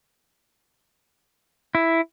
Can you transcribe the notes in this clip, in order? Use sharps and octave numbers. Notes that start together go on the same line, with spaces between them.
E4